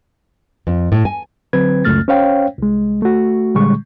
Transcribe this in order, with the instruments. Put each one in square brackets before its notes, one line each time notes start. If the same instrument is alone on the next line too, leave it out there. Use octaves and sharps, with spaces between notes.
[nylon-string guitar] F2
A2
G#5
[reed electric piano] D3 F#3 C4 B4 G#6
C#2 F#2 A3 F6 A6
C#4 C5 C#5 F5 G5
C2 G#3
A3 F#4
A#2 D3 G3 G#3 C#6